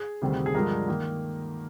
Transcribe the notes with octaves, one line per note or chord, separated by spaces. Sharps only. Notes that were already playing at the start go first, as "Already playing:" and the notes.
Already playing: G#4
D2 C3 D#3 G3 C4
G#4
G2 D3 F3 G#3 A#4
D#3 A#3 A#4